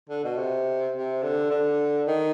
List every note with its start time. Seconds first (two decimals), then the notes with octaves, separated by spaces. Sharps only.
0.09 D3
0.24 B2
0.38 C3
0.95 C3
1.23 D3
1.50 D3
2.07 D#3